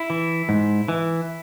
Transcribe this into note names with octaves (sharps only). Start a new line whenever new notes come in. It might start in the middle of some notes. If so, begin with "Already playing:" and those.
Already playing: E4
E3
G#2
E3